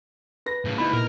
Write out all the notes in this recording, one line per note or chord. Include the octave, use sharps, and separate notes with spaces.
B4 A#6
A2 C#3
D3 A3 B3 D#4 E4 B5
A#2 A#4